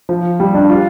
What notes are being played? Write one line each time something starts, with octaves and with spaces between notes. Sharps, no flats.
F3
G3
D4
F4